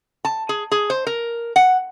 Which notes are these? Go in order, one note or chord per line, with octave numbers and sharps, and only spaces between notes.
A5
G#4
G#4
C5
A#4
F#5